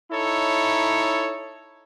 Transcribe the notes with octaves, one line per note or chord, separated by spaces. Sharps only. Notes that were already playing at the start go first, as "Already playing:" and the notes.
D#4 E4 A4 C#5